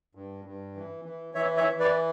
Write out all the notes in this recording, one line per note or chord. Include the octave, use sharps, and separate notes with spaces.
G2
G2
E3
E3
E3 C#5 E5
C#5 E5
E3
B4 D5